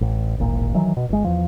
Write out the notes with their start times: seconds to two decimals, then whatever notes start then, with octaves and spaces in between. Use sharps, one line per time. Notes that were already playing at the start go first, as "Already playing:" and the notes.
0.01 A1
0.38 D1 G#1 A#2
0.74 D#3 E3 F#3
0.97 B2
1.09 G1 G#3
1.24 E2 F3